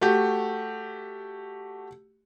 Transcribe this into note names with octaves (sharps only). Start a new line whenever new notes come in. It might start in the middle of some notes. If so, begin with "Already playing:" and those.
A3 F#4 G4